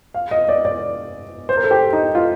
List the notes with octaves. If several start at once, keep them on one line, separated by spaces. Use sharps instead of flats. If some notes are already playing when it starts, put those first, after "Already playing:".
F5
D#5
D5
D5
C5
A#4
A4
G4
D#4
F4